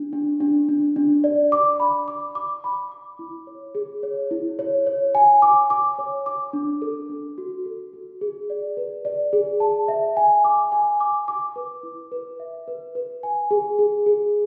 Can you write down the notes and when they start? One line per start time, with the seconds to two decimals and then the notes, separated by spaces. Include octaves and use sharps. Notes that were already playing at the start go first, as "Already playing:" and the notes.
Already playing: D4
0.13 D4
0.41 D4
0.69 D4
0.96 D4
1.24 D5
1.52 D6
1.80 B5
2.08 D6
2.35 D6
2.64 B5
2.92 D6
3.19 E4
3.47 C#5
3.75 G#4
4.03 C#5
4.31 E4
4.59 C#5
4.87 C#5
5.15 G#5
5.42 D6
5.70 D6
5.99 C#5
6.26 D6
6.53 D4
6.82 A4
7.09 D4
7.38 F#4
7.66 A4
7.93 F#4
8.21 G#4
8.50 D5
8.77 B4
9.05 D5
9.33 G#4
9.60 A5
9.88 E5
10.17 G#5
10.44 D6
10.72 G#5
11.00 D6
11.28 D6
11.56 B4
11.83 E4
12.12 B4
12.40 E5
12.68 B4
12.95 B4
13.23 G#5
13.51 G#4
13.79 G#4
14.06 G#4